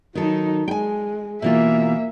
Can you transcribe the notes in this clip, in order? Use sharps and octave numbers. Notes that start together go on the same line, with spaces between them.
D#3 F#3 D#4 A4
G#3 G5 G#5
B2 E3 A#3 F4 E5